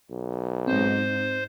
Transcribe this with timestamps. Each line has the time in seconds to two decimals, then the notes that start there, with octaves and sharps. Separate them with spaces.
0.11 B1
0.67 G#2 C4 D#4 C5